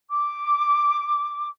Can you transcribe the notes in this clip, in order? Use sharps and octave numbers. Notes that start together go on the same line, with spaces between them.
D6